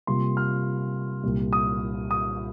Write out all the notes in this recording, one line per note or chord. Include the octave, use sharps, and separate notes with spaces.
C3 G3 A#3 F4 C6
F6
C2 A#2 G3
D#6
D#6